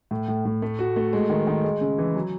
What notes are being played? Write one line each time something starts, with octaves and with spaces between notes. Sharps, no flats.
A2
A2
A2
A3
F#4
A3
G#3
D#3
D#3
G#3
C#3
E3
F#3